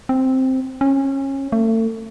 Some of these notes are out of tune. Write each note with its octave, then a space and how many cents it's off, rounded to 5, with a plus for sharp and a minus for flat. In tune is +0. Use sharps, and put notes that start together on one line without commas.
C4 +0
C#4 -25
A3 +35